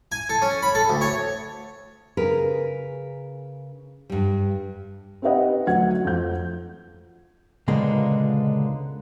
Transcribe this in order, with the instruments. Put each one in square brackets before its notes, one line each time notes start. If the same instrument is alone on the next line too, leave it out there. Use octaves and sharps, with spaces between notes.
[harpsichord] G#5
A4
C#4
B5
A4
D2
C#5
[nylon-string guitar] C#3 G#4 A#4 B4
G2 G3
[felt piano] C4 D#4 G4 B4 D#5 F#5
D2 F#3 F#5 G#6
F2 G6
[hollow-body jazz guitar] C#2 A#2 D3 G#3 A#3 B3